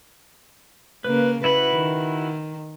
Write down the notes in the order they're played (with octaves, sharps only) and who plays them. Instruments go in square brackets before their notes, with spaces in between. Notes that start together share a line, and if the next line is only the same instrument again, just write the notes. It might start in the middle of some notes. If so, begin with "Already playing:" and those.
[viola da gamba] C#3 A#3 [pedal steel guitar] B4
[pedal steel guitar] E4 F#4 B5 [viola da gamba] B4
[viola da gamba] D#3